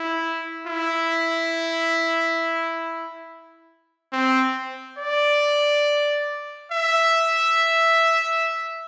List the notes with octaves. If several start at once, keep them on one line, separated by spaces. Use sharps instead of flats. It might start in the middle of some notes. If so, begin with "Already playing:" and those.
Already playing: E4
E4
C4
D5
E5